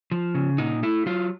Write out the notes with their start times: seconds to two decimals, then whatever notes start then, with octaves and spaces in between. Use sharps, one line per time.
0.12 F3
0.35 C#3
0.58 A#2 D#4
0.83 A3 E4
1.06 F#3 F4